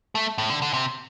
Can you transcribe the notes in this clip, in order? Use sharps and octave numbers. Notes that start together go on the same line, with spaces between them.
A3
A2
D3
D3
C3